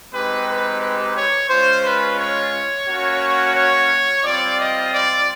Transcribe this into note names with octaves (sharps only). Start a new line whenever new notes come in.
G#3 C4 D#4 G4 B4
B4
B4
C#5
G#3 C#4 F4 C5
B4
C#5
A#3 C#4 F#4
C#5
G3 C4 F4 D5
D#5
D5